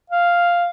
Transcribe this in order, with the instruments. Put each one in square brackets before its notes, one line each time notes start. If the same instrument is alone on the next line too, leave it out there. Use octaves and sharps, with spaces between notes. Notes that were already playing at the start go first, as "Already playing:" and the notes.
[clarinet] F5